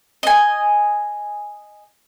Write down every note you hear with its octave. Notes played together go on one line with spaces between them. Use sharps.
D#5 G#5